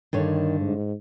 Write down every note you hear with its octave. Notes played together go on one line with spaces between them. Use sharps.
G2 D3 D#3 C#5
G#2